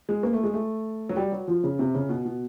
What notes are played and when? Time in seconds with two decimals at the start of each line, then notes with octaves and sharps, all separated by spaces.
0.09 G#3
0.23 A#3
0.33 A3
0.43 G#3
0.54 A3
1.09 F#3
1.16 G3
1.32 F#3
1.48 F3
1.64 C#3
1.79 C3
1.95 C#3
2.09 B2
2.25 B2